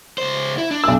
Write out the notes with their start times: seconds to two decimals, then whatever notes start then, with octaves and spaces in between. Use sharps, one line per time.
0.18 C#2 C5
0.58 E4
0.71 D4
0.84 B1 E6